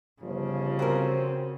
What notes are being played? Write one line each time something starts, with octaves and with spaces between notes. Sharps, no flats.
G1 C#3 F3
C4 F#4 A#4